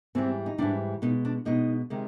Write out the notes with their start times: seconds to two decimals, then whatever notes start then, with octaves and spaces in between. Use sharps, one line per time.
0.15 G#2 E3 G3 C4
0.46 D#4
0.58 G#2 E3 G3 D4
1.02 B2 G#3 D#4
1.25 D4
1.45 B2 G#3 D#4
1.90 C3 D#3 G#3